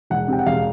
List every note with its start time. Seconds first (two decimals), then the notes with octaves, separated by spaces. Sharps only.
0.10 E1 F#5
0.28 C3 G5
0.39 F#5
0.46 E1 F5